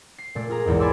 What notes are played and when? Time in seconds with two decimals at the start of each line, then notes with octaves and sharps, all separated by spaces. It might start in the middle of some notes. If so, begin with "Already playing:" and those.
0.18 C7
0.35 A#2 A3 D5
0.49 F4 G#4 A#5
0.65 B1 E2 G#2
0.80 D5 G#5 B5 C6 D6 E6